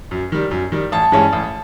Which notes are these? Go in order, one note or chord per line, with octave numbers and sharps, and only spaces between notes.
F#2
D#3 G3
F#2
D#3 G3
A1 A5
G2 E3 G#3 C#4
A1